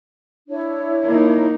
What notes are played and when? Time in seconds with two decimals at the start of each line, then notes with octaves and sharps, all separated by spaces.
0.49 D4 E4 C#5
1.07 A#3 D#4